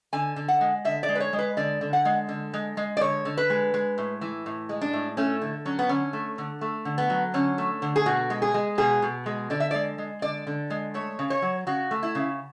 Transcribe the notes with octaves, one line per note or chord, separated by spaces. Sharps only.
D3 G#5
D3
F#5
G#3
D3 E5
D5
G#3
B4
C#5
G#3
B4
D3 D5
D3
F#5
G#3
D3
G#3
G#3
D5
D3 C#5
D3
B4
G#3
G#3
A2
E3
A2
G#3
D4
A2
A3 C#4
D3
F#3 C#4
B3
D3 C#4
A3
D3
A3
D3
B3
F#3
D3 C#4
A3
D3
G#4
B2 F#4
G#3
G#4
G#3
B2 G#4
B2
G#3
D3 D5
E5
G#3 D5
G#3
D3 D5
D3
G#3
A3 C#5
C#3
C#5
F#3
C#3 F#4
A3
E4
C#3